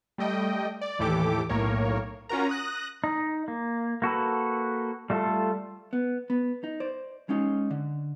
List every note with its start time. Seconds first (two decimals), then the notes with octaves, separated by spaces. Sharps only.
0.18 G3 A3 D#5 G5
0.81 D5
0.99 D#2 A2 E3 G4 A4 D6
1.49 B1 A2 A#3 A#4 C#5
2.29 C#4 F4 F#4 A#4 A#5
2.49 D#6 F#6 A#6
3.04 D#4
3.48 A#3
4.02 A#3 F#4 A4 B4
5.10 G3 A3 F4 A4
5.93 B3
6.30 B3
6.64 D#4
6.80 C5 D5
7.29 G#3 C#4 D#4
7.71 D3